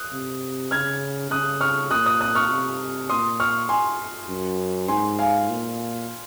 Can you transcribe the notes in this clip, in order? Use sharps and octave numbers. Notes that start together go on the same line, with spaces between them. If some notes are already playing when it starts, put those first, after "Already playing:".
Already playing: D#6 F#6
C3
C#3 F6 G#6
C#3 D#6 F#6
C#6 F6
A#2 D#6 F#6
D#6 F#6
D#6 F#6
C#6 F6
C3
A#2 C6 D#6
C#6 F6
G#5 C6
F#2
G#2 G#5 C6
F5 G#5
A#2